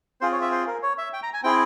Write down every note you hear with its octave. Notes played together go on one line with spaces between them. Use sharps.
C4 F4 G#4 C5
C#5
E5
C5
A#4
C#5
E5
G5
A#5
G#5
C4 E4 G#4 G5